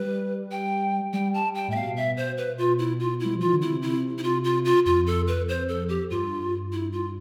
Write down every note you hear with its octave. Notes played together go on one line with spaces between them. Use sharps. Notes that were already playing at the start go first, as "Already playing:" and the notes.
Already playing: G3 B4
G5
G3 G5
A5
G5
A2
E5
B2 F5
E5
C5
B4
F4
E4
F4
G3 E4
F3
E3 F4
D3
C3 E4
E4
E4
F4
F4
F4
F2 F4
A4
B4
C5
A4
G4
G2 F4
E4
F4